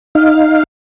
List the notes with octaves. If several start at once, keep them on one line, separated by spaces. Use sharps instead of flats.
D#4 F5